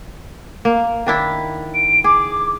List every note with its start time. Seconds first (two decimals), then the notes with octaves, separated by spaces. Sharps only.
0.65 A#3
1.07 D#3 D4 E4
1.74 D7
2.04 G#4 D6